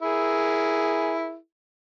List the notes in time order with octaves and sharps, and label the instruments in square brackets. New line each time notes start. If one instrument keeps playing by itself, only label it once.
[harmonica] E4 G#4 A#4